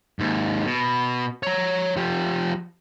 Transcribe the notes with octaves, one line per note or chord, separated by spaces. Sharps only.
D#2 G#2
B2
C#5 A#5
F3 G4